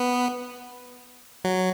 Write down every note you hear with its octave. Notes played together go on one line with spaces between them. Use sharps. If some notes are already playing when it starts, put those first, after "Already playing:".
Already playing: B3
F#3